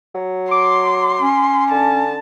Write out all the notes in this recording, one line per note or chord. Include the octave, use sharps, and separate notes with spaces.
F#3
C6 D6
C#4
D3 A5